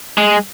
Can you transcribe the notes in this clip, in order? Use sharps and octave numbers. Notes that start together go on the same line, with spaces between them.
G#3